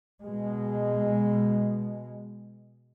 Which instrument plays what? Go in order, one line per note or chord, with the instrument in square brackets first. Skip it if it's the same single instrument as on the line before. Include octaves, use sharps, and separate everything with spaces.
[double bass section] B2 G#3